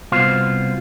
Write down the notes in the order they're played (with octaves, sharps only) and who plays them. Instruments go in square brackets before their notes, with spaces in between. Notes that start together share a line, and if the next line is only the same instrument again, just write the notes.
[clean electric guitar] C2 B2 F4 C5